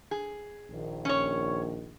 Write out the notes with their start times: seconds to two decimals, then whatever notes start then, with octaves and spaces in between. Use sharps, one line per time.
0.11 G#4
0.72 A#1 D#3
1.05 C#4 C#5